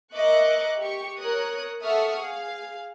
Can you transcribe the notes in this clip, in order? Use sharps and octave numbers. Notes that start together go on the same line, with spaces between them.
A#4 D#5 E5 C#6 D6 F#6
G4 C#6
A#4 C#5 D#6 F#6
A4 E5 F#5 C#6 D#6 F6
G#4 F5